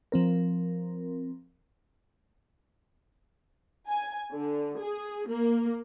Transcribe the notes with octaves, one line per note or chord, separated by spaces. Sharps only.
F3 C4 A#4
G#5
D3
G#4
A#3